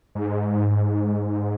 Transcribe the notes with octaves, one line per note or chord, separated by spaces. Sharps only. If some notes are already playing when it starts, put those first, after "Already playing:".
G#2